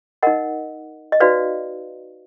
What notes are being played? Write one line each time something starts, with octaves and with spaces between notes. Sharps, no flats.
D#4 A#4 D#5 F#5
D#5
D#4 F#4 B4 D5 F5